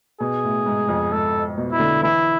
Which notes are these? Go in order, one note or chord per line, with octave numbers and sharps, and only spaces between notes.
B2 G#4
A2
G#2
F2
G#2 A4
B2
E4
D3
E3 E4